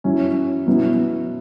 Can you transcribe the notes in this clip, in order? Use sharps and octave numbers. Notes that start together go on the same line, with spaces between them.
F#2 F#3 C#4 E4
B2 F#3 B3 E4